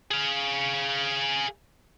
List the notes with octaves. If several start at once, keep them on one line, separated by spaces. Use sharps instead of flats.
G#4 F5